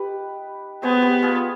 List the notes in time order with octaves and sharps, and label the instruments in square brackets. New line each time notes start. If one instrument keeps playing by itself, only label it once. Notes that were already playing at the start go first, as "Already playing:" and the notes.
Already playing: [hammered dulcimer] D#4 G4 B4
[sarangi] B3 [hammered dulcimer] G#4 C5
[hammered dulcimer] G4 B4
F4 G#4